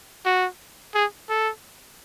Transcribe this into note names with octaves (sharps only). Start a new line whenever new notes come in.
F#4
G#4
A4